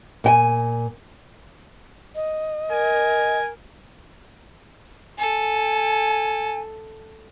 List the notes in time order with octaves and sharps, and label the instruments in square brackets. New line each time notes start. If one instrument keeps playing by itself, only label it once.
[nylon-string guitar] A#2 G5 G#5
[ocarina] D#5
[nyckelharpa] A#4 [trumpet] G#5
[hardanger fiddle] A4 [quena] G#5